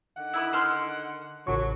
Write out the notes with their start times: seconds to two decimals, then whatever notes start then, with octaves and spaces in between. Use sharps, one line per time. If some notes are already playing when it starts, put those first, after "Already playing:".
0.17 D3 D#3 F#5
0.33 E4 B5 D#6
0.53 A5 C6 F6
1.47 A1 C#3 F#3 C#6